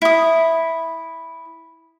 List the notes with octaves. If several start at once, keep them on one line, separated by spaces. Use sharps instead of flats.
E4 D#6